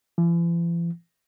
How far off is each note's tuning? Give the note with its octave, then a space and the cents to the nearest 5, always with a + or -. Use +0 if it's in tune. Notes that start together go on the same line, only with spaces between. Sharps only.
E3 +45